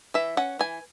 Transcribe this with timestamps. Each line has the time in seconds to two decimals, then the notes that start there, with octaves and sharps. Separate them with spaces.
0.14 E3 E5
0.37 C#4 F#5
0.59 E3 G#5